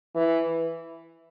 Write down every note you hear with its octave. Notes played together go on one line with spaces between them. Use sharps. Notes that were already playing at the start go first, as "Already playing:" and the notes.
E3